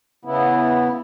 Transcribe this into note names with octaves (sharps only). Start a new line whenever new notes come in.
C#3 B3 E4